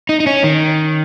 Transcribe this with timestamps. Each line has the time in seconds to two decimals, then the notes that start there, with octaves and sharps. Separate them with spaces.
0.09 D#4
0.20 D#4
0.27 C#4
0.44 D#3